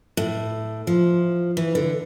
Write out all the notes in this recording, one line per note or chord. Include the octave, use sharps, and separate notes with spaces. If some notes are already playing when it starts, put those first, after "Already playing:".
A2
F3
E3
D3